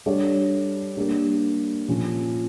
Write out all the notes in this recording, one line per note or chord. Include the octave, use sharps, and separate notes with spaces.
G3 D4 A4 C#5
G3 A#3 D4
A#2 F3 C#4